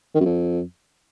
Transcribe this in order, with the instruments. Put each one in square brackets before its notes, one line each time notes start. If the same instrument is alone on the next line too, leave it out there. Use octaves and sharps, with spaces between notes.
[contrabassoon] D#3
F#2
F2